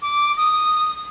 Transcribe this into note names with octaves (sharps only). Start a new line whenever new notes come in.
D6
D#6